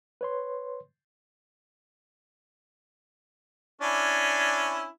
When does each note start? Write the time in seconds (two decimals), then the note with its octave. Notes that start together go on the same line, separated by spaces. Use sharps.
0.21 B4 C#5 C6
3.82 C#4 D4 E4